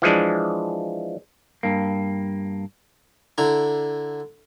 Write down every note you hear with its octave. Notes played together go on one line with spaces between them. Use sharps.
E3 F3 G#3 D4
G2 A#3
D3 E4 A#5